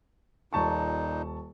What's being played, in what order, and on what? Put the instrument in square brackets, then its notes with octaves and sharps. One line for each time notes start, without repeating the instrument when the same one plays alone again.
[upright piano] D#1 A5 C#6 [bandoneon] A#2 D#4